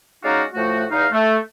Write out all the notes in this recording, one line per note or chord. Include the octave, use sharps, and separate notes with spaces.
G#3 C#4 D#4 F#4 D5 F5
A2 F3 A3 F#4
E2 D#4 F5
A3